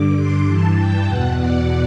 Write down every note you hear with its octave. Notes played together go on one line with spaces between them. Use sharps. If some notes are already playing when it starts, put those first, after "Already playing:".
Already playing: G2 D3 D6
C6
G2 E3 A5
G5
E2 B2 F#5
D5